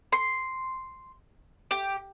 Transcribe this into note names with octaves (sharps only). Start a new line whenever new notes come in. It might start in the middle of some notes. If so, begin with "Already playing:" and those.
C6
G4